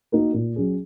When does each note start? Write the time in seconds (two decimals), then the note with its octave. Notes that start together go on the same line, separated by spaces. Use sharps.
0.12 A#3 D#4 F#4 A#4
0.34 A#2
0.56 F#3 C#4 G#4